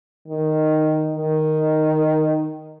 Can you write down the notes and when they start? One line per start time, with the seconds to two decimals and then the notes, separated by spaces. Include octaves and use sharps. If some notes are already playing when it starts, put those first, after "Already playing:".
0.28 D#3
1.15 D#3